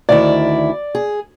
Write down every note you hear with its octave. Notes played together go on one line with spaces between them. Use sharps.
D2 D#3 E4 D5
G#4